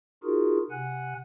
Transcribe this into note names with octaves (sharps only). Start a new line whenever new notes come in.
D#4 F4 F#4 G#4 A#4
C3 F#5 G#5 F#6